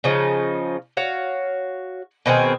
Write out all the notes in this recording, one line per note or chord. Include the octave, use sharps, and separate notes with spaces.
C#3 F3 D#4
F#4 C#5 F5
B2 D#3 C4 G#4